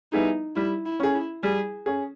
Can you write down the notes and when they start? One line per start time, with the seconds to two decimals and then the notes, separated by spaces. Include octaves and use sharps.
0.13 G3 B3 D#4 E4 G#4
0.56 G3 E4
0.86 E4
1.00 C#4 G#4
1.15 E4
1.43 G3 G#4
1.86 C#4 G#4